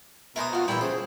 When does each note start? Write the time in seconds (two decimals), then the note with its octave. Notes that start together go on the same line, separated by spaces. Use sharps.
0.36 B2 E4 A#4 C5 A#5 D#6
0.53 F4 F#4 F5
0.68 A#2 E3 G3 E4 A4 G5
0.81 C#3 G#4 C5